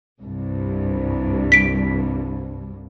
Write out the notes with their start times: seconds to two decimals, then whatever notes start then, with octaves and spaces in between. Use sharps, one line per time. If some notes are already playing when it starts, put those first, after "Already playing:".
0.22 C2 G2
1.52 B6 D7